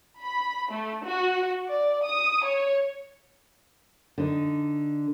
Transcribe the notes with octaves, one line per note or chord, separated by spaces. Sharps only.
B5
A3
F#4
D5
D#6
C#5
D3 D#4